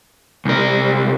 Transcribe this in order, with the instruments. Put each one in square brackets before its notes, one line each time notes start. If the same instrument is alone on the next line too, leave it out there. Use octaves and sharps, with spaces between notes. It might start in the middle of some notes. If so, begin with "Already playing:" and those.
[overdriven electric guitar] C2 A#4